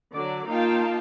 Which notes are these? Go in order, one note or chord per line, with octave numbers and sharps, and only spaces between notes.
D3 F#3 D5
A#3 D#4 F4 F5 G5 A5